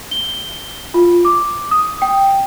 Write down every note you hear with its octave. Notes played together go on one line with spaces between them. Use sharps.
G7
F4
D6
D#6
G5